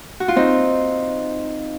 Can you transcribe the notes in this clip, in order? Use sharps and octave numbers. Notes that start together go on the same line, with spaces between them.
F#4
F4
C4 D#4